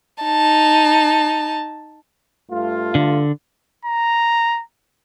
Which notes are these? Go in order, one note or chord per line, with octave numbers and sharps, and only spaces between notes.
D#4 A5
G2 A3 F4
D3
A#5